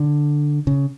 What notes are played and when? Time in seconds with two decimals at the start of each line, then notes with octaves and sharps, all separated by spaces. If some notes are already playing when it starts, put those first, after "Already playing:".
Already playing: D3
0.67 C#3